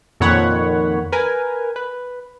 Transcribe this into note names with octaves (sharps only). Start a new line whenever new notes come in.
F2 A#2 D#3 C#5 F#5 B5
A#4 B4 G#5
B4